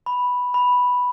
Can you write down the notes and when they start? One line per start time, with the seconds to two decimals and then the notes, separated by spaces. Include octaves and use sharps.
0.06 B5
0.54 B5